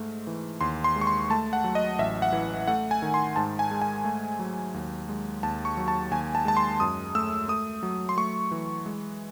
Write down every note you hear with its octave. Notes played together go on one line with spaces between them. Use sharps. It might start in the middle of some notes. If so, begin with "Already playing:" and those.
Already playing: G#2 G#3 A3
E3
D#2 C6
C6
G#3
C#6
C6
A3 A5
F#5
F#3
D#5
A1 E5
F#5
E3
A3 F#5
G#5
D#3
C6
G#2 A5
G#5
G#3
G#5
A3
F#3
D#2
G#3
D#2 A5
C#6
F#3
A5
D#2 G#5
A5
G#3 A5
C6
F#2 D#6
A3 E6
A3 D#6
F#3
C6
A3 C#6
E3
G#3